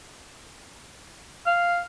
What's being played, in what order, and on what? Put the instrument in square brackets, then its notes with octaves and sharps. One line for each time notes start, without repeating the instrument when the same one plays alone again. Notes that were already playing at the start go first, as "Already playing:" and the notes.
[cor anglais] F5